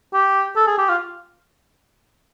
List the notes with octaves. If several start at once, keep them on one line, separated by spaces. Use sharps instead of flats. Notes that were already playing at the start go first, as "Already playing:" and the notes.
G4
A4
G#4
G4
F4